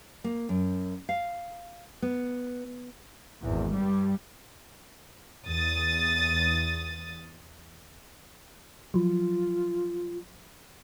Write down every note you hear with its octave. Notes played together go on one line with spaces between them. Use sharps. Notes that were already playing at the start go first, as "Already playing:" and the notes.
A#3
F#2
F5
B3
G#1 E2
G2 G3
E2 D#6 A6
F3 F#3 F4